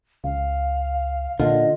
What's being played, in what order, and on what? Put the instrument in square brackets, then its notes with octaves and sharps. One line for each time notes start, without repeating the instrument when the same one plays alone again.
[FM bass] C#2 [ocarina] F5
[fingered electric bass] A#2 D3 [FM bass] F4 [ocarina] D#5